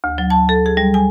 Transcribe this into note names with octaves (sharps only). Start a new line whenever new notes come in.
D2
F#3
A5
A4
G#4
G3
G#5